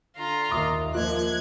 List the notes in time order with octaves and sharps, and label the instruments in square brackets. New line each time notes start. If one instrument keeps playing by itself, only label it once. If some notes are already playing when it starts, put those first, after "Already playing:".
[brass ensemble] D3 [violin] F4 A#5
[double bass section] D#2 [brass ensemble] E5 [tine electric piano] B5 D6 D#6
[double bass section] F3 A#3 [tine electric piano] F4 D#5 [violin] F#6 G#6